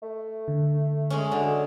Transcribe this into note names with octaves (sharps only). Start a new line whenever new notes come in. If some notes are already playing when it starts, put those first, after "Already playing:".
A3
D3
G#3 C#4
D3 F#3